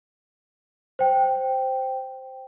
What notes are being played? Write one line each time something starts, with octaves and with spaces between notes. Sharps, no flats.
C5 G5